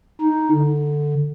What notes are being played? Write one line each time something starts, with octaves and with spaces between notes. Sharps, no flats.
D#4
D3